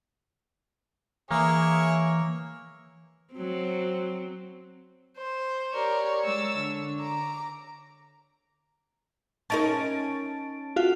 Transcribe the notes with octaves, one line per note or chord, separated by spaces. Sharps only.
E3 A#3 E4 G#4 C#5
F#3 C4
C5
G4 A#4 C#5 D5
G#3 E6 A6
D3
A#5 D6
C#4 D#4 A#4 A5 A6 D7
F4 F#4 F5